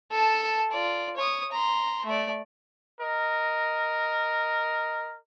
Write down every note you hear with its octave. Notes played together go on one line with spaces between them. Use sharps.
A4 A5
F4 D5
C#5 D#6
A#5 C6
A3 D5
A#4 D#5